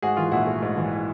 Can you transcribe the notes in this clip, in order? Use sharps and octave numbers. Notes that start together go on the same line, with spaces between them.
G#2 F#4 G#4
E3 F4
A#1 E4 F#4
A3
G#2
E3